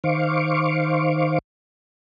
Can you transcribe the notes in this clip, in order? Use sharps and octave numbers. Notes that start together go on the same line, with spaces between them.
D#3 C5 F5 C#6 D6